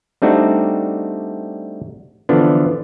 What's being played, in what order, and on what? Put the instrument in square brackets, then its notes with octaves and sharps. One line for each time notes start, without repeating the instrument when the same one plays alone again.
[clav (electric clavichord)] G3 A3 C4 D4 D#4 F#4
D3 E3 F3 B3 D4